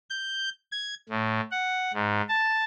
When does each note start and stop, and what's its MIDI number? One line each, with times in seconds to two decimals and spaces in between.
0.10 0.49 91
0.72 0.95 92
1.09 1.40 45
1.52 1.92 78
1.93 2.21 44
2.29 2.64 81